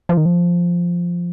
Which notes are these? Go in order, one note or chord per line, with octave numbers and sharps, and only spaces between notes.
F3
D#3
F3